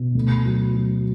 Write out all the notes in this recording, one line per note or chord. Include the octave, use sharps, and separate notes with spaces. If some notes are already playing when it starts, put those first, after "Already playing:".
Already playing: B2
D2
F#3
F#3